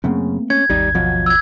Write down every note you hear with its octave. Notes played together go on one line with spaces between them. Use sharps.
F#2 C#3 A3 A#3 C4
C#4 G#6
G#1 D#2 G3 D#4
B2 F3 F#3
E6 G#6